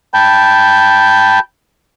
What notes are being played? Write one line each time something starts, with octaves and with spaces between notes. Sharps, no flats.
G5 A5 B5 G6